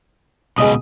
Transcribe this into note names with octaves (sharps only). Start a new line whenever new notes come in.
C#2 B2 G#4 D#5 D#6